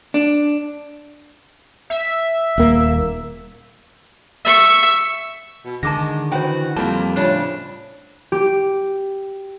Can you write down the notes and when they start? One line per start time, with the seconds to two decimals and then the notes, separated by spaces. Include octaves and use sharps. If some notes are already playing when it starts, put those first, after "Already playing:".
0.14 D4
1.90 E5
2.58 D#1 A#3
4.45 E5 C#6
5.65 B2
5.83 D3 D#3 G#3 A5 D6 A#6
6.32 E3 D#4 F#4 C5 G5
6.77 F2 G3 A#3 A5
7.16 A2 C#3 F3 D4
8.32 G4